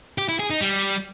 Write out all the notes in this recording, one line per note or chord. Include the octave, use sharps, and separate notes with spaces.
G4
E4
G#4
D#4
G3